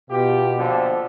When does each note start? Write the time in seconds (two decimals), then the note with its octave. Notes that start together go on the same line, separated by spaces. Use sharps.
0.11 B2 F4 G4
0.58 A#2 D3 F3